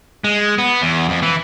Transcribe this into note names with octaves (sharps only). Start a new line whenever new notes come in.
G#3
B3
E2
F2
E3